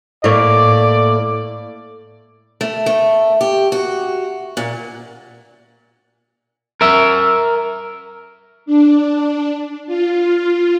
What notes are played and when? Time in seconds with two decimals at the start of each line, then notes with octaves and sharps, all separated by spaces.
0.24 A2 A#3 C#5 D5
2.61 A3
2.86 A3
3.41 G4
3.72 F#4
4.57 A#2
6.81 A#4 E5
8.66 D4
9.87 F4